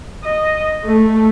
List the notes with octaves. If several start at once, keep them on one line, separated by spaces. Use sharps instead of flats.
D#5
A3